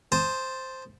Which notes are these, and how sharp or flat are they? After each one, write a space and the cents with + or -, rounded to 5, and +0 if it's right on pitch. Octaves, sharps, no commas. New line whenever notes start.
C5 +0 A5 +0 D#6 +0